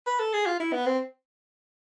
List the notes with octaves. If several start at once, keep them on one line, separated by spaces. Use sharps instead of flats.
B4
A4
G#4
F4
E4
B3
C4